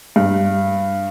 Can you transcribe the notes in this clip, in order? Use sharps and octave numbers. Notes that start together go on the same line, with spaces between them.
G2